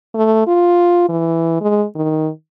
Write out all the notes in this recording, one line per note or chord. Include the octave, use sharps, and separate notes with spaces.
A3
F4
E3
G#3
D#3